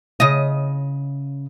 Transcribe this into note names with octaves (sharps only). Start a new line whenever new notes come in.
C#3 D#5